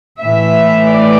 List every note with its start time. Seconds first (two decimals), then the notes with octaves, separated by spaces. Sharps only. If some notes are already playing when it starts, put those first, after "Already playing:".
0.20 A2 E3 E5
0.89 D5